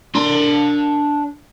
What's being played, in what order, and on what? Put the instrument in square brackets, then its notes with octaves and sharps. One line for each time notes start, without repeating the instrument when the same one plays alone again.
[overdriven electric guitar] D4 C6